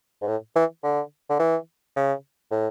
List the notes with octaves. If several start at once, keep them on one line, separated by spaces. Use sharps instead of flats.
G#2
A2
E3
D3
D3
E3
C#3
A2